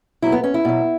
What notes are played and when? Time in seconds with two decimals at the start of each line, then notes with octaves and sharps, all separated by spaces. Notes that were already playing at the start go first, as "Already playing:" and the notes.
0.22 B2 F#3 E4
0.32 B3
0.44 C#4
0.54 E4
0.65 B2 F#3